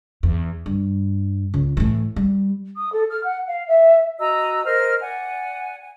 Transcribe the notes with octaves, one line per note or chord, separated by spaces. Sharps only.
E2
G2
C#2
A2 E3
G3
D#6
A4
F6
F#5
F5
E5
F#4 D#5 A#5 E6
A#4 C5 D#5 F6
D5 F#5 G#5
G#5